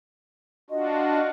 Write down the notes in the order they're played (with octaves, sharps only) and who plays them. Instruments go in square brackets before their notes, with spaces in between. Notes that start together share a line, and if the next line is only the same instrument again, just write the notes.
[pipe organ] D4 F4 F#4 [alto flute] D#5